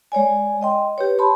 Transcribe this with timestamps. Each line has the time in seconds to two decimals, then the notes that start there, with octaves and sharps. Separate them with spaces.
0.12 G#3 C#5 D5 G#5
0.61 D#5 G5 C6
0.98 G4 B4 C#5
1.19 C#5 A5 B5 C6